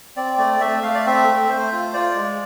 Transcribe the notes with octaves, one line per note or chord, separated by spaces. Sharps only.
C4 D5
A3 D5
A3 E5
A3 F5
D5
C4 E5
A3
A3 C5
F4
F4 D5
G#3